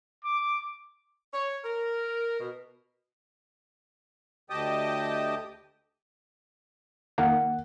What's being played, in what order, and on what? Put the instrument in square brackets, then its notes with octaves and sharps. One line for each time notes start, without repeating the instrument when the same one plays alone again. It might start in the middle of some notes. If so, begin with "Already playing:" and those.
[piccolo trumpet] D6
[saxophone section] C#5
A#4
B2
[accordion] D2 G4 D#5 G5 A5 D#6
[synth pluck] D#3 A#3 [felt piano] F#5